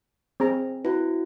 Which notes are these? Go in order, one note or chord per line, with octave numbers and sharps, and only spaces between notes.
C4 G#4 A#5
E4 F#4 B4